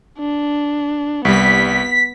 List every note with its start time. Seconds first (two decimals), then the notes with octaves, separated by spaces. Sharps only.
0.18 D4
1.25 C2 G3 B3 B6